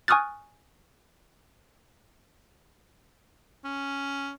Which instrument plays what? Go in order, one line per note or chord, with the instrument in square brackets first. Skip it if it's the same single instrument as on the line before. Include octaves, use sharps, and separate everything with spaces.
[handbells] G#5 C#6 D#6 F6 F#6 A6
[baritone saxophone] C#4